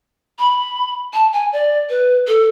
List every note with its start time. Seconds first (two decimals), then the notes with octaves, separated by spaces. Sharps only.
0.39 B5
1.14 A5
1.33 G#5
1.53 D5
1.89 B4
2.28 A4